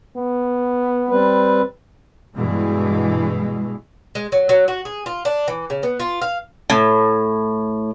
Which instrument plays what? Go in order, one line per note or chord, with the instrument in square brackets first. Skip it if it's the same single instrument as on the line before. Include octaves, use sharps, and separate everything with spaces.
[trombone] B3
[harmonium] G3 C4 B4
[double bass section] G2 B2 E3 G#3
[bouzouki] G#3
F#3
F#3
F#4
G#4
F4
D4
E3
C#3
B3
F4
F5
A2